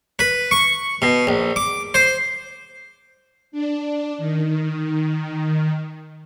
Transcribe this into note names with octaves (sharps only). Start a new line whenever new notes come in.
B4
C#6
B2
A#1
D6
C5
D4
D#3